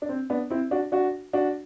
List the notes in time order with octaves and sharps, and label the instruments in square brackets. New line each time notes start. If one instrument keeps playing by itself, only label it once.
[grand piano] D4
C4
B3 D4
C4 E4
D4 F#4
D4 F#4
D4 F#4